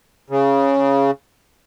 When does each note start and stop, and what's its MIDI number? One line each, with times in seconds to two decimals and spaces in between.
0.30 1.11 49